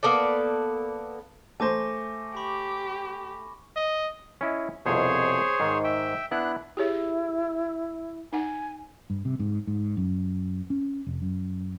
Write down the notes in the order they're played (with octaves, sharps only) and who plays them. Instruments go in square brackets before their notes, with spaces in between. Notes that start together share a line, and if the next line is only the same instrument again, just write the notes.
[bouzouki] A#3 B3 A4 D5
[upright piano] A3 C5 [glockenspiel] G#5 D6 A#6
[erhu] G4 [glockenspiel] B5 C#6
[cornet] D#5
[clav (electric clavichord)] C#4 E4 D#5
[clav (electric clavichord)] C2 F2 B2 [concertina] G#4 C5 C#5
[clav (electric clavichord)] G#2 D#3
[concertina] E5 G5
[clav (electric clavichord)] B3 E4 [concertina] D4 F#6
[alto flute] E4 [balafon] G4 G#4 C#5
[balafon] D#4 F#5 [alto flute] G#5
[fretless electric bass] G2
C3
G#2
G#2
F#2
C#4
F1
F#2